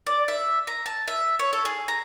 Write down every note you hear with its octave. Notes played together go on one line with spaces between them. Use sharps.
D5
E5
A#5
A5
E5
C#5
A4
G#4
A#5